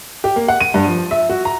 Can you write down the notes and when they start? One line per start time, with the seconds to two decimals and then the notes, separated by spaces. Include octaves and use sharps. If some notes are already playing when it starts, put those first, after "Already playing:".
0.24 G4
0.36 A#3
0.48 F#5
0.60 D#7
0.74 G2
0.87 F3
1.11 E5
1.29 F#4
1.45 A#5